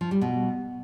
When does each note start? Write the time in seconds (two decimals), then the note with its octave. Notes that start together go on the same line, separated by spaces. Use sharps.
0.01 F3
0.11 G3
0.21 B2